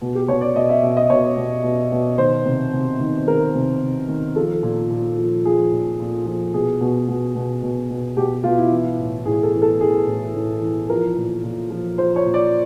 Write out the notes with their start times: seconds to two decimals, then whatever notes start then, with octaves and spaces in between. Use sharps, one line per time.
0.02 B2
0.15 G4
0.28 B2 C#5
0.41 D5
0.55 B2 D#5
0.69 E5
0.82 B2 E5
0.97 D#5
1.10 B2 C#5
1.37 B2
1.64 B2
1.92 B2
2.18 D#3 C5
2.45 C3
2.73 C3
3.00 D#3
3.27 D#3 A#4
3.54 C3
3.82 C3
4.08 D#3
4.36 F3 A4
4.63 A#2
4.91 A#2
5.18 F3
5.45 F3 G#4
5.72 A#2
6.00 A#2
6.26 F3
6.54 B2 G#4
6.81 B2
7.08 B2
7.35 B2
7.62 B2
7.90 B2
8.17 B2 G4
8.44 B2 F4
8.57 E4
8.71 E3
8.99 A2
9.25 A2 G#4
9.43 A4
9.54 E3
9.62 A4
9.80 E3 G#4
10.07 A2
10.34 A2
10.61 E3
10.89 F3 A#4
11.16 A#2
11.43 A#2
11.70 F3
11.98 F3 C5
12.16 C#5
12.25 A#2
12.34 D5